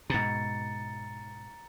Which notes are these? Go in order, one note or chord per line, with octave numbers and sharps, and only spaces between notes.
G#2 B2 A#5 A6 C#7